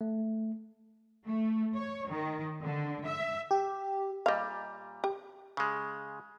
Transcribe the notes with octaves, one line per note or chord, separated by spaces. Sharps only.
A3
A3
C#5
D#3
D3
E5
G4
A#2 G3 D#5 F5
G4
C#3 G#3